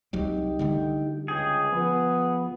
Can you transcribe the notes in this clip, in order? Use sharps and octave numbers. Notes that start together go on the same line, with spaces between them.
C2 F#3 G3 D#4 G4
D3 G3 A3
C#2 G#4 G5 G#5
F3 B3